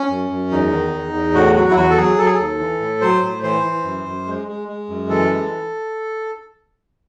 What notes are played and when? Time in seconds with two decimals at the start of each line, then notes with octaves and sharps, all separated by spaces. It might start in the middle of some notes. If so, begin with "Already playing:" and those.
Already playing: C#4
0.10 F#2
0.30 F#2
0.51 E2 D#4
0.71 D#3
0.93 E2
1.14 E2
1.34 A2 F#4
1.55 F#3 F#4
1.71 E4
1.76 E2 F#4
1.90 A4
1.97 F#3 G#4
2.18 F#3 A4
2.26 G#4
2.35 D#2 A4
2.60 E3
2.80 A2
3.01 F#3 C5
3.22 A2
3.43 E3 C5
3.64 E3
3.85 F#2
4.05 F#2
4.26 G#3
4.47 G#3
4.68 G#3
4.89 F#2
5.09 E3 A4
5.31 G#3